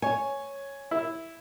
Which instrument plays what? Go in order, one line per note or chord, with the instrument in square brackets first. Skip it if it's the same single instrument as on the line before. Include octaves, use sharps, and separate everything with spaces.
[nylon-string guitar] C#5 [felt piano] G#5
[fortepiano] E4